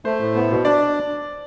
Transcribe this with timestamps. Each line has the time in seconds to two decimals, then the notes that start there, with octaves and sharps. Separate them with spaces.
0.05 A3 C5
0.21 A2
0.35 B3
0.50 B2
0.65 D4 D5